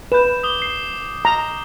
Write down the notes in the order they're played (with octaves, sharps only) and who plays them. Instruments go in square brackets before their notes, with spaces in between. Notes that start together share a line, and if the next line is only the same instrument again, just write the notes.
[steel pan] B4 [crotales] G6 E7
[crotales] D6 D#6 G7
C7
[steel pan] A#5